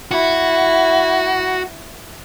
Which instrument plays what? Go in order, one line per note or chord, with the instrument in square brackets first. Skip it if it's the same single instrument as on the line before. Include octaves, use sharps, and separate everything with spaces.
[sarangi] E4 [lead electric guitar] F#4